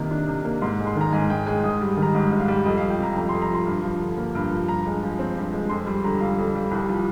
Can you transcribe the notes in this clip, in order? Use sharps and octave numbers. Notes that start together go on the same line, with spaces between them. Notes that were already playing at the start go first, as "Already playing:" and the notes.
Already playing: C3 D#3 A#3
D4
C3
A#3
G#2 C6
G#3
C6
D#3 A#5
G#2 G#5
G#2 G5
G#3 G#5
G#2 D#6
G3
D#3
A#5
G#2
G#2
F5
G3
F2 D#5
F5
F3
G5
C3 A#5
F2 A#5
C6
F2
A#5
F3 C6
G2
F3
D3
A#3
G2
F3
G2 A#5
G#3
F3
C4
G2
G#3
F2 C6
G3 C6
D3 A#5
F2 F5
F2
G3
C2
F3